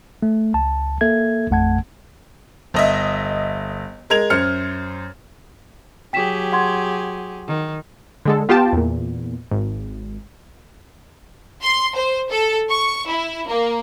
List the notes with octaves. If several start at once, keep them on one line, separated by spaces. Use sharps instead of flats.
A3
C#2 A5
A#3 A4 E5 G#6
A1 F2 A3 F#5 A5 G#6
G1 D#5 E5
G#3 A#4 G#6 F7
F#2 C5 F6 C#7
F#3 G4 G#4 G5 B6 E7
F#5 C6 G#6
D#3
D3 G#3 A4
B3 F4 G4 G5 A5
E2 A#2
G#1
C6
C5
A4
C#6
E4
A#3